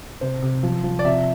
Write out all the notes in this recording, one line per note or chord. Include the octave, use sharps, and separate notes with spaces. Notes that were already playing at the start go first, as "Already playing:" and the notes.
C3 C5
C3
F3
F3
D5
C3 E5